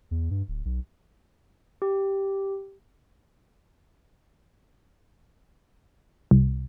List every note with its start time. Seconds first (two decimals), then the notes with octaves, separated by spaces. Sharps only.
0.11 E2
0.30 G2
0.48 D1
0.65 B1
1.82 G4
6.31 C2